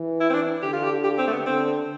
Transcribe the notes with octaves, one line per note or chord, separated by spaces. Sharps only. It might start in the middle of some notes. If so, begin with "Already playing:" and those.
Already playing: E3
E4
C4
D4
D3 G4
F4
G4
G4
C4
A3
B3
D3 C4